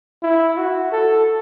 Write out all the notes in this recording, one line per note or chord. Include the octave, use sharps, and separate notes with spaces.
E4
F#4
A4